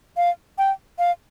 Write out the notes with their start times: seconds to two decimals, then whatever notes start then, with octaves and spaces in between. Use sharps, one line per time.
0.17 F5
0.58 G5
0.99 F5